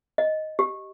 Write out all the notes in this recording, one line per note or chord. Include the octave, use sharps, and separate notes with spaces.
D#5
G4